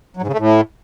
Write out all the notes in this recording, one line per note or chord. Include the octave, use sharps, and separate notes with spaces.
F#3
G#2
C#3
A3
A2